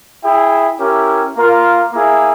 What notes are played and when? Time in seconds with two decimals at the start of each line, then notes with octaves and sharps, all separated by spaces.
0.23 E4 G#4 E5 G5
0.79 C#4 E4 G4 A#4
1.36 A#3 F4 A#4 F5
1.92 A#3 E4 G#4